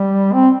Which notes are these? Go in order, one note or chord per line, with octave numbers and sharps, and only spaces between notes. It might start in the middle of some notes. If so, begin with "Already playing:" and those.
Already playing: G3
C4